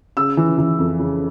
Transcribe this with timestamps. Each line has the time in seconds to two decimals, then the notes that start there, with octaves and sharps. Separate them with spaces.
0.17 C#3 E6
0.37 E3
0.58 E3
0.79 F2
0.99 C#3